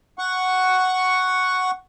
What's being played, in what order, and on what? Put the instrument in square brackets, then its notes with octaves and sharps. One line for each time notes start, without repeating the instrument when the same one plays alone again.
[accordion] F#5 C#6